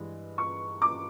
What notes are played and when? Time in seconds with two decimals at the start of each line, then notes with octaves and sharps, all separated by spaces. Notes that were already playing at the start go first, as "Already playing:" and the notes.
Already playing: G2 E3 G#3
0.38 C#6
0.82 D6